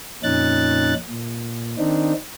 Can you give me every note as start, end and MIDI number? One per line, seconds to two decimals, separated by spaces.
0.23 0.94 41
0.23 0.94 46
0.23 0.94 61
0.23 0.94 63
0.23 0.94 90
0.23 0.94 93
1.10 1.75 46
1.78 2.13 51
1.78 2.13 60
1.78 2.13 62
1.78 2.13 63